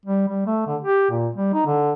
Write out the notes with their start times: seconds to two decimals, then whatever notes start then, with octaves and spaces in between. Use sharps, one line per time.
0.06 G3
0.28 G3
0.47 A3
0.67 D3
0.82 G4
1.10 A#2
1.36 G3
1.54 D#4
1.66 D3